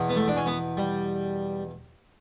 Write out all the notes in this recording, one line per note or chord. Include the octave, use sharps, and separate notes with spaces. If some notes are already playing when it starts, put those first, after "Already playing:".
Already playing: E2 B2
B3
A3
D4
C#4
B3
G3